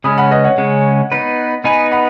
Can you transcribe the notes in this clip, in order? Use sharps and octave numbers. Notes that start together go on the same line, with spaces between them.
C#3 G#3 C#4 B5 D#6
F#5 B5
B4 D#5
C#5 F#5
C#3 G#3 C#4
B3 D#4 B4
B3 D#4 B4 D#5 G#5
F#5 B5